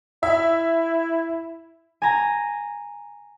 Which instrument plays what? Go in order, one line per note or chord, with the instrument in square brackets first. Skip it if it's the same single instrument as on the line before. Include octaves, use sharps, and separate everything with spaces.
[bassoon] E4 [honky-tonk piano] E5
[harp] G#5 A#5